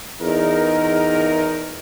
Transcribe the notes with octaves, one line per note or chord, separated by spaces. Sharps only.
E2 D#4 A#4